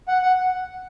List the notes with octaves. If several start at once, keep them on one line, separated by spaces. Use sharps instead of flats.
F#5
F#5